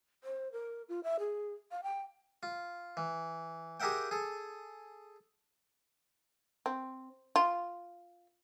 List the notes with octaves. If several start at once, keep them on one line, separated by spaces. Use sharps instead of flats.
C5
A#4
F4
E5
G#4
F5
G5
F4
E3
G4 G#4 A#4 E5 F#5 G5
G#4 A4
C4
F4